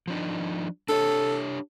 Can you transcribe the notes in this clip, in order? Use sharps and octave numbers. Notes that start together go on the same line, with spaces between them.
F3 D4 D#4
D4 G4 A4 C#5